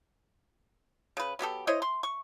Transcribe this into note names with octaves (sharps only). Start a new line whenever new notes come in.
C#3 B4
F#3 B3 G4 A4
E4 C5 C#5 D#5
C6
C#6